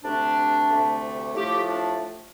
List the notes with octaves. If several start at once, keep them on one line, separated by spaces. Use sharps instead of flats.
D2 C3 A3 D4
D2 C3 A3
A2 F3 A3 G4
D4